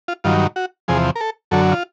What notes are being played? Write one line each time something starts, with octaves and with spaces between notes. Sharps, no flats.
F4
G2 D#3 F#3 F4
F#4
E2 C3 F3 G#4
A#4
A4
F#2 D3 F#3 A4
F4